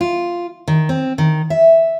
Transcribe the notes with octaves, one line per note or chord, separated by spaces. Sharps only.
F4
D#3
C4
D#3
E5